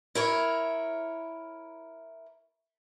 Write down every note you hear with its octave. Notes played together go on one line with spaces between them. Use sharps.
E4 A#4 C#5